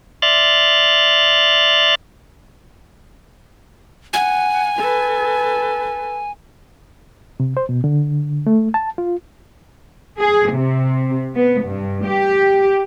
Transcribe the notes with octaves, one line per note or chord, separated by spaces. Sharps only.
D5 E5 C6 F6 F#6 A6
F#5 G#5
A4 B4
C3
C5
B2
D3
A3
A5
F4
G#4
C3
B3
G2
G4